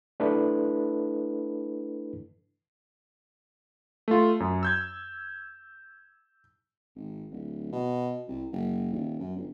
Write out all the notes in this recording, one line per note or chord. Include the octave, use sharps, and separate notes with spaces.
A3 D4 E4 A4 B4
A3 F4
F#2
E6 G6 G#6
G#1
D1
B2
C2
F#1
D#1
F#2
G1